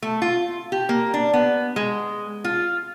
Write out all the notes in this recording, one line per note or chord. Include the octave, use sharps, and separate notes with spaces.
A3
F4
G4
A#3
D4
B3
G#3
F4